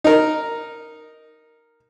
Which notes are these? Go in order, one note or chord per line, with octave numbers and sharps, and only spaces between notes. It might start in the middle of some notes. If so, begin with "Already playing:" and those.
D#4 A#4